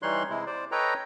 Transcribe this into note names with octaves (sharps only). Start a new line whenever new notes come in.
E3 G3 D#4 C#5 C6 F#6
C3 G#3 E4
C5 D5
A4 B4 C#5 D#5 G5 A#5